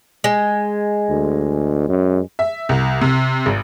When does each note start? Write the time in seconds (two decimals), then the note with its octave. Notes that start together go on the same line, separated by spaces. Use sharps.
0.24 G#3
1.10 D2
1.89 F#2
2.39 E5
2.69 C2
3.01 C3
3.46 G#1